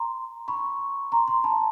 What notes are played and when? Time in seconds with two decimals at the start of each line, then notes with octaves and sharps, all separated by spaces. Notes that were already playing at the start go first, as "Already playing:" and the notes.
Already playing: A#5 C6
0.48 B5 C#6
1.12 A#5 C6
1.28 A#5 C6
1.44 A5 B5